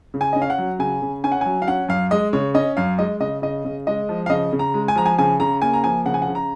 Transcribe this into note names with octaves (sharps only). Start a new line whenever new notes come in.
C#3
G#5
C#4 D#5
F5
F#5
F#3
C#3 G#5
C#3
C#4 G#5
F#5
F#3 G#5
F5
C#4 F#5
F#2 F5
G#3 D#5
C#3 C#5
C#4 D#5
F#2 F5
G#3 D#5
C#3 D#5
C#3 D#5
C#3
G#3 D#5
F3
F5
C#3 D#5
C#3
A#5
G#3
G#5
F3 A#5
G#5
C#3 G#5
C#3 A#5
A#3 G#5
A#5
F3 G#5
C#3 F#5
G#5
F#5
C#3
A#5